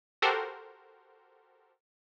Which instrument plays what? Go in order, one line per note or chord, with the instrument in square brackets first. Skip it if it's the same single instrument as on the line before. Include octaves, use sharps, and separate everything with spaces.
[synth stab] F#4 G4 A4 A#4 C5